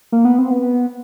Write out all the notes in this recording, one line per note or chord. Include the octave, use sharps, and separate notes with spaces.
A#3
B3
C4
B3